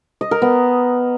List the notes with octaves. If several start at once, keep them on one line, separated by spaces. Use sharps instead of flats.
D#5
A#4
B3